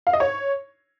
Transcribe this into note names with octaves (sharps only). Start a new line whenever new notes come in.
F5
D#5
C#5